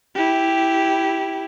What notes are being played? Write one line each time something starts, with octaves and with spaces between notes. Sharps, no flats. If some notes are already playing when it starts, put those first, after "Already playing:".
E4 G4